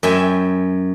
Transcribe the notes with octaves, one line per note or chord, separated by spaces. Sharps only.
F#2 E5 G5 G#5